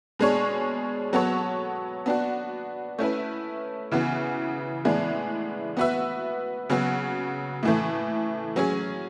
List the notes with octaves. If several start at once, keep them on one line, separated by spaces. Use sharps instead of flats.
B2 G#3 D4 G#4 C#5
F#3 B3 F#4 A4 C#5
B3 D4 F#4
A3 C#4 E4 B4
C#3 E3 B3 F#4
A2 E3 G#3 B3 D4
B3 F#4 B4 E5
C#3 F#3 B3 F#4
A2 E3 A3
F#3 C#4 G#4